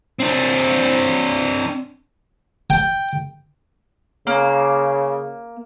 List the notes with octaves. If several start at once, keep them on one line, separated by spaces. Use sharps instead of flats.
C4 D4
G5
C#3 A#3